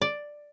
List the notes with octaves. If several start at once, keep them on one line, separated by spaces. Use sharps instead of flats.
D5